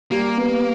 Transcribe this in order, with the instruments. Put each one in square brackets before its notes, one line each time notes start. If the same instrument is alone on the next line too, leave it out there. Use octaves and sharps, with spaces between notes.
[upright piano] G3 [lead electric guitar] A#3
[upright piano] B3